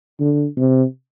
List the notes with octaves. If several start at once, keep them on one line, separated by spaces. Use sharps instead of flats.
D3
C3